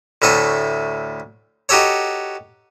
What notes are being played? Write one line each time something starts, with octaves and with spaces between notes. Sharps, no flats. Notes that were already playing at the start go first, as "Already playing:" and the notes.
D2 A2 A4 C#6 D#6
D#4 F#4 G4 A4 C#5